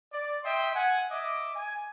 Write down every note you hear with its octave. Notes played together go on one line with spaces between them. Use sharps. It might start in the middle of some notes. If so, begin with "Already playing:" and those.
D5
D#5 E5 G5 C6
F#5 G#5
D#5 E5 D6
G#5